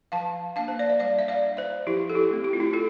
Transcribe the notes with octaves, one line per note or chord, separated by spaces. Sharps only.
F3 F5 A5
A#3 D4 F5 A5
C5
D5
E5
G3 D5 F5
E5
D5 F5
D4
C5 E5
F3 E4 G4
A4
E4 G4
A3 C4
G4
F4
E4 G4
F4 A4